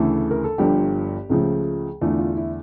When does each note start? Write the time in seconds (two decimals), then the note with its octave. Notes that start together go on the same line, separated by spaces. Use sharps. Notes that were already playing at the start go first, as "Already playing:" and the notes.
Already playing: D2 C#3 E3 A3 A4
0.31 A#4
0.44 A4
0.58 G1 G2 F3 G4
1.30 C#2 C#3 F3 A3
2.01 E2 D3 A3 F4
2.19 F4
2.37 E4